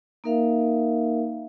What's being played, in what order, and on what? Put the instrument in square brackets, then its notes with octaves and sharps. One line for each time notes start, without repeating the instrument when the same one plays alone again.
[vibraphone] A#3 D#4 A#4 E5 F5